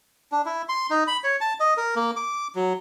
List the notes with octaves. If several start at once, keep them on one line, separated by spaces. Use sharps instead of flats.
D4
E4
C6
D#4
B5
C#5
A5
D#5
A#4
A#3
D6
F#3